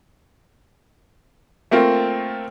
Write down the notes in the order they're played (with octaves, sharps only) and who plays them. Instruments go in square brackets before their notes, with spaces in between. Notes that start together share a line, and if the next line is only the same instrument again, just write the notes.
[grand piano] A3 A#3 C4 F4